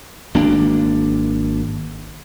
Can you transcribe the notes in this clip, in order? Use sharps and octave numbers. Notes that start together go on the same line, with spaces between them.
G#1 A#3 D4